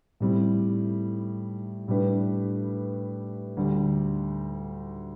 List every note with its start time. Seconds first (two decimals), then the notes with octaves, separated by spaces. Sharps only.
0.20 A2 G3 C4 E4
1.88 A2 G3 D4 G4 B4
3.57 D2 D3 G3